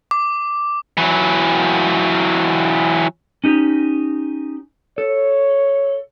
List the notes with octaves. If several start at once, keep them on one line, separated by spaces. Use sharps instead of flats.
D6
E3 F#3
C#4 D#4 G4
A4 C#5